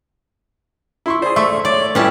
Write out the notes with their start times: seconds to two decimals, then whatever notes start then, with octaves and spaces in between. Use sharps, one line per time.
1.06 E4 C6 C#6
1.22 G#4 C5 D5
1.36 A3 E5 C6 C#6
1.65 C#5 D5
1.95 A2 G3 C#4 E4 B4 A5